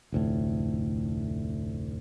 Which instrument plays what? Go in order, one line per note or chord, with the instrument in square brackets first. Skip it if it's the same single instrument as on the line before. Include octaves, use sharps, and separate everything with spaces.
[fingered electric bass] F1 D2 A2